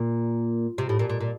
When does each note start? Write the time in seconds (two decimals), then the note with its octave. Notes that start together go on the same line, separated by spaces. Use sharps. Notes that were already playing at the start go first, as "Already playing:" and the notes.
Already playing: A#2
0.78 C3
0.89 A2
0.99 A#2
1.10 A#2
1.21 A#2